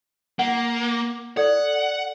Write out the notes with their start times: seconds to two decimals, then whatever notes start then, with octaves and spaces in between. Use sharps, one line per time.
0.39 A#3 F#5
1.37 A4 D5 F#5